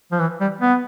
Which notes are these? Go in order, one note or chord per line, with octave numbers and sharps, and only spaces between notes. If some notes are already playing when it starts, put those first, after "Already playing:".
F3
E3
G3
B3